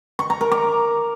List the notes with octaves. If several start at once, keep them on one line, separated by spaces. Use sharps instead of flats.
C#6
A#5
A#4
D6